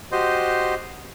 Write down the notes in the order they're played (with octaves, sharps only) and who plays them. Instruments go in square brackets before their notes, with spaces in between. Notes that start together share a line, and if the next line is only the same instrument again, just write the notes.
[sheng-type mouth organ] F#4 G4 C5 D#5 C6